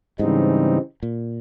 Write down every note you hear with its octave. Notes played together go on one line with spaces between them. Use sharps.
G#2 C#3 E3 G3 C4 D#4
A#2